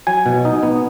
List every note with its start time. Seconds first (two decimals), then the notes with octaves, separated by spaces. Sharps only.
0.07 F#3 G#5
0.26 B2
0.45 D#4
0.63 B3